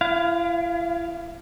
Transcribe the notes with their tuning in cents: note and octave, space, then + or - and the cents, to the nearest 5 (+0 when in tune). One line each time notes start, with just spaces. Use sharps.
E4 +40 F5 +0